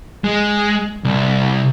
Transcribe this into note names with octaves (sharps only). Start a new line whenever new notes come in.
G#3
C2